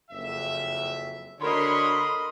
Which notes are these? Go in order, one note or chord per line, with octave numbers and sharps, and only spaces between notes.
F#1 F2 E5
D3 F#4 A#4 C#5 D#5 B5 C6